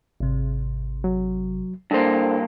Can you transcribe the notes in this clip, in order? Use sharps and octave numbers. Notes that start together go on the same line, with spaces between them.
G#1 C3
F#3
G2 A#3 D4 A4 C5